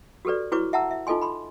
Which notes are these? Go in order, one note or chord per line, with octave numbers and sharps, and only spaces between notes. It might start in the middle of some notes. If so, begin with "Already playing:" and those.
F#4 G4 A4 B4 D5
E4 F#4 B4 C#5 C#6 D6
E5 F#5 A5 A#5 E6
E5
D#4 F4 A4 D#5 G#5 C6
B5 C6